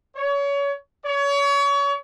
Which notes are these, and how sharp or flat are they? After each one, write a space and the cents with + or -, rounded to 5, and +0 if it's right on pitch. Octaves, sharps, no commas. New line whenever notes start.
C#5 +30
C#5 +30